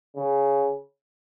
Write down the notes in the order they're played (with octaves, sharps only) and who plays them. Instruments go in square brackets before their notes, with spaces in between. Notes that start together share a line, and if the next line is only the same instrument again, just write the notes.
[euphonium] C#3